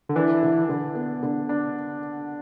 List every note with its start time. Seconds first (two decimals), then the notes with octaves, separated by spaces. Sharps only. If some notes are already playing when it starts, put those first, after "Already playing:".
0.09 D3
0.16 E3 D4
0.42 D3
0.69 D3
0.95 B3
1.23 D3
1.49 D4